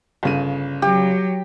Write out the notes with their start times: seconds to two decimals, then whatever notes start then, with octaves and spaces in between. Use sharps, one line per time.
0.23 G1 C#3 D#7
0.82 F#3 G4